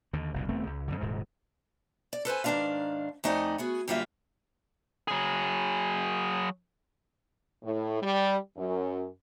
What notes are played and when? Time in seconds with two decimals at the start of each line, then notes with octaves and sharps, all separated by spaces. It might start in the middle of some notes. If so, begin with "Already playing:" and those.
0.13 D#2 D3
0.33 F#1 C2 A#2
0.49 D#1 A3 B3 C4
0.67 C#2
0.88 F2 G#2 D3
1.01 D#1 G#2 C3
2.13 D5
2.25 A4 B4 C5 G#5
2.44 G#2 D#3 C4 D4 D5 F5
3.24 F2 A3 D#4 D5 F#5 G#5
3.58 B3 F#4 G#4
3.88 F#2 D3 G3 A#3 F4 E5
5.08 F#3 G#4
7.64 A2
8.02 G3
8.56 F#2